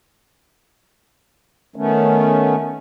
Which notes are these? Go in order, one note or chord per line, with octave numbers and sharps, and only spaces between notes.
D#3 A3 B3 C#4